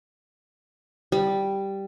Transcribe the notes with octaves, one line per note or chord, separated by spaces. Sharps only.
G3